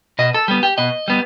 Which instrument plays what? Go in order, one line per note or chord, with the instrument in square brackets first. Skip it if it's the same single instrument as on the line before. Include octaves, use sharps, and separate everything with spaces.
[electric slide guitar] B2 D#5
A4
G3 B3
G4
B2 D#5
G3 B3